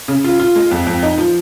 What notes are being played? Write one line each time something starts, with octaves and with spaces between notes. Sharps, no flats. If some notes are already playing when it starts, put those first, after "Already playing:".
C#3
F4
F4
G#3
F2
F2
D#4
F3